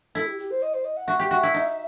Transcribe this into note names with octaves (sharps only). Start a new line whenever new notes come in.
E4 A4
G4
G4
C5
D#5
C5
D#5
F#5
F#4 E5
G4
F#4
E4
D#4